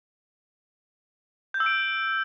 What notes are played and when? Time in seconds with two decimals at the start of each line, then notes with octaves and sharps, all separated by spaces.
1.54 G6
1.60 E6
1.66 D7